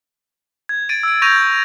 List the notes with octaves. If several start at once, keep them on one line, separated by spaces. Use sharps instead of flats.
G#6
A6 D7 D#7
E6 D7
C#6 G6 G#6 A#6 D#7 F7